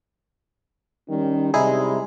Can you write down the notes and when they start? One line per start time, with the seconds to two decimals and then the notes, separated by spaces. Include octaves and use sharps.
1.09 D#3 G3 C#4
1.54 C3 G3 G#3 D#4 E4 G#4